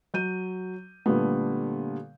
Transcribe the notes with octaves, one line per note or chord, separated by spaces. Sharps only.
F#3 G6 D#7
A#2 D3 G3 A3 B3